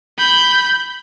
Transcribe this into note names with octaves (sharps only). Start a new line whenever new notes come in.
B5 G6